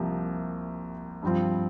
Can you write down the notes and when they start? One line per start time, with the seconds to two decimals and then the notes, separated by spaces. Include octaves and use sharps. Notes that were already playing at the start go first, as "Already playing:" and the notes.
Already playing: C2 C3 F3 A#3
1.22 G2 F3 C4 F4